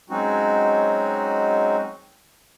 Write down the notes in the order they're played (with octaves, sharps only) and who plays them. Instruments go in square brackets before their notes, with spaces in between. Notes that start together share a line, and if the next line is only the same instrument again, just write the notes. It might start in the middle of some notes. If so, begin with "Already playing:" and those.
[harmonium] F#3 G#3 C4 C#4 D#4 F#4